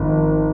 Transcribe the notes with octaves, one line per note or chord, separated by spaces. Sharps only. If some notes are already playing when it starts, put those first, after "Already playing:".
Already playing: G#1 F3